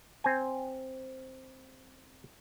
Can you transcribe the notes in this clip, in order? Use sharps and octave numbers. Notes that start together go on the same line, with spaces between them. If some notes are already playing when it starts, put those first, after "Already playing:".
C4 G#5